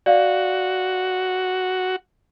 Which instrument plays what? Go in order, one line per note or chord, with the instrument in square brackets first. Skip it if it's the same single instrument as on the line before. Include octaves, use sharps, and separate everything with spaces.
[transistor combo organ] F#4 [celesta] D5 F5